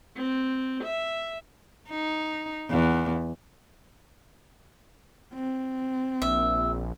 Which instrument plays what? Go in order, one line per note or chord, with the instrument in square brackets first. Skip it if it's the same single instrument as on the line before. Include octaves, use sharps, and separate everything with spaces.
[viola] C4
E5
[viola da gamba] D#4
E2
[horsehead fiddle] C4
[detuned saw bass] A#1 [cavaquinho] E5